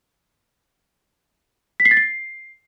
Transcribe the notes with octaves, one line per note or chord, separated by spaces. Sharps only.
B6
C7
A6
C7